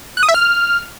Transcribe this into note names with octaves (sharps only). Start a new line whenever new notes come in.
F#6
D#6
E5
F6